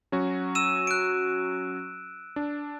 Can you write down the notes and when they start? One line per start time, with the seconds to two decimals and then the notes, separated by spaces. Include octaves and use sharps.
0.12 F#3 C#4 F#4
0.55 E6 D#7 E7
0.87 F#6 D7
2.36 D4